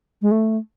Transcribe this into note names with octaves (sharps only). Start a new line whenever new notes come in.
G#3
A3